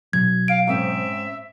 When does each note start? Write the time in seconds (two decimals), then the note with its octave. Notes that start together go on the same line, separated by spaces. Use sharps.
0.13 B2 F#3 G#6
0.48 F5 D7
0.67 G#2 C4 C#4 E5